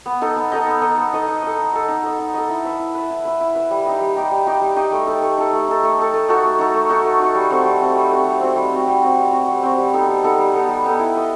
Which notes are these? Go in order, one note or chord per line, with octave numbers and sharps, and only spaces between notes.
B3
D#4 A4 D#5
B3
D#4 A4 D#5
B3
D#4 A4 D#5
B3
D#4 A4 D#5
D#4
A4 D#5
D#4
A4 D#5
D#4
A4 D#5
D#4
A4 D#5
E4
B4 E5
E4
B4 E5
E4
B4 E5
E4
B4 E5
G3
D#4 G4 D#5
G3
D#4 G4 D#5
G3
D#4 G4 D#5
G3
D#4 G4 D#5
A3
D#4 A4
A3
D#4 A4
A3
D#4 A4
A3
D#4 A4
A3
D#4 F#4 A4
A3
D#4 F#4 A4
A3
D#4 F#4 A4
A3
D#4 F#4 A4
G3
C4 F#4 A4
G3
C4 F#4 A4
G3
C4 F#4 A4
G3
C4 F#4 A4
G3
C4 F#4
G3
C4 F#4
G3
C4 F#4
G3
C4 F#4
G3
B3 D#4 A4
G3
B3 D#4 A4
G3
B3 D#4 A4
G3
B3 D#4 A4
E4
B4 D#5